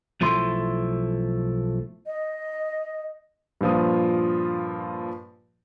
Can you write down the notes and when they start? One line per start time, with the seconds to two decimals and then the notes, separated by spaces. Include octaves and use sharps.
0.21 B1 F3 A3 E4 C6
2.07 D#5
3.61 G2 A#2 F3 F4 D#6